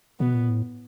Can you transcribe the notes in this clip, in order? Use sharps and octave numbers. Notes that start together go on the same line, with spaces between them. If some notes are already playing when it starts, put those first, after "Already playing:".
B2 B3
A#2
A2